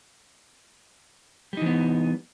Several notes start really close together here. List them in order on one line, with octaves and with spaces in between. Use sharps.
G3 D#4 E3 B3